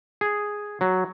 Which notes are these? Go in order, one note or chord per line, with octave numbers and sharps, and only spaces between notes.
G#4
F#3